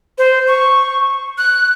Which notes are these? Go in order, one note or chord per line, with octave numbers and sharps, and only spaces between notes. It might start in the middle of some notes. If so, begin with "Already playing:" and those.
C5
C#6
F#6